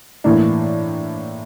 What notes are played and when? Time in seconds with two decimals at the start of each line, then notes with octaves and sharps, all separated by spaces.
0.24 A2 E3 A#3 D4